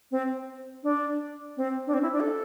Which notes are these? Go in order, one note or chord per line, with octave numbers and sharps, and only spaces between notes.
C4
D4
C4
D4
C4
E4
D4
A4